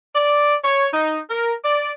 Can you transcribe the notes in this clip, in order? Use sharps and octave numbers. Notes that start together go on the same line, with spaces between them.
D5
C#5
D#4
A#4
D5